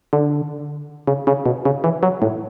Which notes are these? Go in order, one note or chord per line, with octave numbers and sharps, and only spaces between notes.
D3
C#3
C#3
B2
C#3
E3
F#3
A2